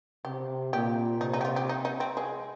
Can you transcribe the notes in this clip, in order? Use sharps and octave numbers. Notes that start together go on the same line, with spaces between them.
C3 G4
A#2 G4
C3 D#4
D#4
G4
F4
G4
D#4
D#4
C4
G#3